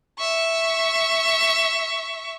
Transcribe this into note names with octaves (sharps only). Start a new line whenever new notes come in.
E5 C#6